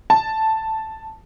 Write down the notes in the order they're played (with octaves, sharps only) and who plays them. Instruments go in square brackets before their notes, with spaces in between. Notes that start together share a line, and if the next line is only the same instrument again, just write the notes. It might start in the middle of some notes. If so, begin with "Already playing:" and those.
[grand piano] A5